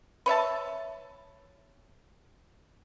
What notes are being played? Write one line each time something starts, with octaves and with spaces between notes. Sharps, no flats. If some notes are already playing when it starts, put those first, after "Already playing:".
B4 C#5 E5 A5